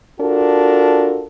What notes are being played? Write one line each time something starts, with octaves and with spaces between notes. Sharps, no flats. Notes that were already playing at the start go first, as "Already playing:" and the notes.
D4 F4 F#4 A4 A#4